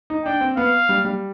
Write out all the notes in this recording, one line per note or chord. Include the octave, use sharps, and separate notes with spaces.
D#4
D4 G5
C4
B3 F5
G3
G3